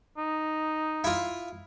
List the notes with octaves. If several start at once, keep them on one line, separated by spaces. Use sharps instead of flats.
D#4
E4 F4